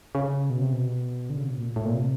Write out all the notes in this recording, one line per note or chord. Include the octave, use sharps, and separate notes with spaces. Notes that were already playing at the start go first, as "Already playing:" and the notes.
C#3
B2
C3
B2
D3
C#3
C3
B2
A#2
A2
A#2
C3